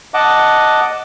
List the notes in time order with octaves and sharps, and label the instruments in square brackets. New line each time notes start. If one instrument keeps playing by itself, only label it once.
[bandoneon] D#5 F#5 A5 D6